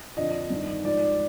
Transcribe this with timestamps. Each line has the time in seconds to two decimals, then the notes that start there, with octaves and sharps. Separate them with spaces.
0.17 F2 D3 F3 D#5
0.50 G2 D#3
0.84 G#2 F3 D5